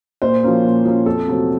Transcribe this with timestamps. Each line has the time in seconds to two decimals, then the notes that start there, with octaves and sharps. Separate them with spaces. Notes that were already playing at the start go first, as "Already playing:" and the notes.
0.22 A#2 C5
0.43 F3 A#3 C#4
0.63 A#2
0.85 F3 A#3 C#4
1.06 F2 A4
1.28 C3 F#3 A3 C4